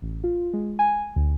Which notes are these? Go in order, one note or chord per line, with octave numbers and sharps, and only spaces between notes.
A1
F4
G#3
G#5
D2